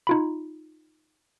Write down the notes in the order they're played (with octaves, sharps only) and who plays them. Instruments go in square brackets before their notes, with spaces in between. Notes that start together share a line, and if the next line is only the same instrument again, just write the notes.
[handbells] D#4 F4 B5